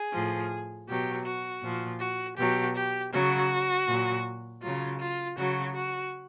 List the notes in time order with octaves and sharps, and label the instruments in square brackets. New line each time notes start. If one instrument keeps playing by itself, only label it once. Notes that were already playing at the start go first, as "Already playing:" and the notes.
Already playing: [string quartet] G#4
A2 F3
B2 F#3 G4
F#4
A#2 F3
F#4
B2 F#3 G4
G4
C#3 F#3 F#4
A#2 F#3
C#3 F#3 F4
F4
C#3 F#3 F#4
F#4